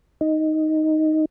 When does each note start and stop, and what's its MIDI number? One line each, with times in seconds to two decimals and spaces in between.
0.21 1.25 63